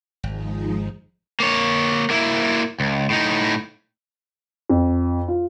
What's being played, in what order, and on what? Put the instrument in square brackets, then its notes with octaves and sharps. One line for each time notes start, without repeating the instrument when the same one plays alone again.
[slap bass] G#1 [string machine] F3 G#3 D#4
[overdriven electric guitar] A#3 C#5
A#3 E4
C#2
A2 D#4
[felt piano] F2
F4